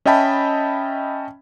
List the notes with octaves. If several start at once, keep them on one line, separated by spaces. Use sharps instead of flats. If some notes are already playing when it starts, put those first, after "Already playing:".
C#4 D#5 E5 G5 A5 B5